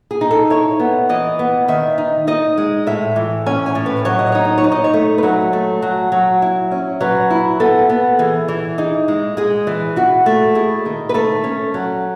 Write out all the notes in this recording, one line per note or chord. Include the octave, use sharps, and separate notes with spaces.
G#4
D#4
A4
E4 C#5
B3
E3 D#5
B3
D#3 E5
D#4
D#4 D#5
G#3
A2 E5
E3
C#4 G#5
G#5
A2
B4
F#3 C#5
D#5
D#4 C#5
D#5
C#5
D#4
D#5
C#5
A3
B4
F#3 C#5
A3
F#3
F#3
E4
C#4
F#3 B4
E4
B3 A4
B3
E3 G#4
E3
D#4 G#4
G#3
G#3 G#4
E3
E4 F#4
A3
E4 G#4
D#3
B4
A3 A4
C#4
F#3